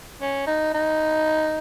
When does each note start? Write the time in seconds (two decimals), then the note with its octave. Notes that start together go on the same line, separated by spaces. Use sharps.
0.22 C#4
0.47 D#4
0.74 D#4